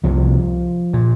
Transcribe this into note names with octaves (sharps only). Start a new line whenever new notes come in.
C2 C3 F3
A#2